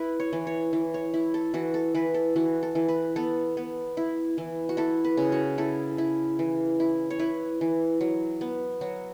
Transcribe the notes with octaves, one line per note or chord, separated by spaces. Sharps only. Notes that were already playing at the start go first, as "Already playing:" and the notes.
Already playing: E4 B4
C#5
E3
C#5
E3
C#5
E4
A4
E3 F#4
A4
E3 B4
A4
E3 F#4
A4
E3
B4
B3 A4
B3
E4
E3
F#4
E4 A4
B4
C#3
F#4
E4 A4
E4
E3
E4
C#5
E4 B4
E3
F#3
B3
F#3 F#4